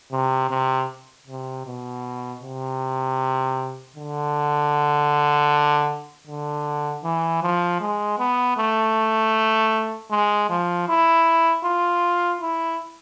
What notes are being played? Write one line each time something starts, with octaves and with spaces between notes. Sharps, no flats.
C3
C3
C3
B2
C3
D3
D3
E3
F3
G#3
B3
A3
G#3
F3
E4
F4
E4